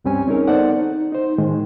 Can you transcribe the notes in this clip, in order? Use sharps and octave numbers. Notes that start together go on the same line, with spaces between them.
C#2 G2 G3 C4 C#4 G#5
C4 C#4 D#4 G#4 A#4 C#5
B3 D#4 A4 C5 D5 F#5
D#4
D#4 C5
A2 D#3 G#3